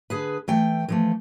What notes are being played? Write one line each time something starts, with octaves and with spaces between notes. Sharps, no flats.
D3 G#4 B4
E3 A3 G5
E3 F3 A3